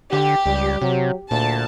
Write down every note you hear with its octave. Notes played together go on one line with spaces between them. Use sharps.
D3 G4
C#2 G3
C3 F#3
D2 A#2 A5